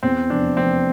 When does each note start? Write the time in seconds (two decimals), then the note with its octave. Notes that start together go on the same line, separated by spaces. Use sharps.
0.03 E2 C4
0.30 F1 D4
0.57 F1 C4